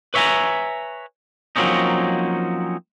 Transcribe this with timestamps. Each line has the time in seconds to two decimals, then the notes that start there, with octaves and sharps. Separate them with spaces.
0.14 B4 C#5 E5 F5 G#5 A#5
1.56 F3 F#3 A#3 C4 C#4 D#4